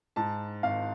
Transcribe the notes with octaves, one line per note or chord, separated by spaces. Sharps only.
G#2 A5
G#1 F5